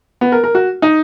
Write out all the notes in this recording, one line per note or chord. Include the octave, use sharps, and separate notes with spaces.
B3
A#4
A#4
F#4
D#4